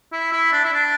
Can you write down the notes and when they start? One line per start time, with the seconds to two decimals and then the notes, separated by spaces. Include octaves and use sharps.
0.13 E4
0.33 E4
0.52 D4
0.65 E4
0.73 D4